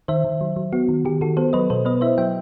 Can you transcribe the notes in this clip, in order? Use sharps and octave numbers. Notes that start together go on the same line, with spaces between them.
D#3 C5 E5
D#3
F#3
F#3
B3 F#4
D#3
D#3 G4
D#3 F#4 A4
B3 A4 C5
F#3 B4 D#5
B2 A4 C5
B3 B4 D#5
E4 C5 E5
F#3 E5 G5